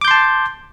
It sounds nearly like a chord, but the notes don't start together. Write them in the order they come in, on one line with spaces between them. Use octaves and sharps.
D6 G6 C6 A5